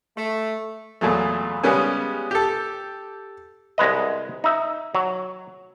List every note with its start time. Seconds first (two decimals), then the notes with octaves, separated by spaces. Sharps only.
0.16 A3
1.01 E2 A#2 F#3 A3
1.63 C#3 G3 G#3 B3 C#4
2.31 G4 A4
3.78 C2 G#3 B4 D#5
4.44 D#4 E5
4.95 F#3